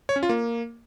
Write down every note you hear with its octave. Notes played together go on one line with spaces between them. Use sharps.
C#5
C#4
F4
A#3